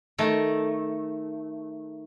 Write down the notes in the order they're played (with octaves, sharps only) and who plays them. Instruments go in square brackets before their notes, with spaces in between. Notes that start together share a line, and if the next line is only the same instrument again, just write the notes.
[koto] D#3 A3